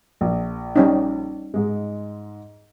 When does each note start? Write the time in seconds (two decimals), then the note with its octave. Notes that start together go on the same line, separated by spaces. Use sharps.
0.21 A#1
0.76 G3 C#4 D#4
1.54 G#2 G#3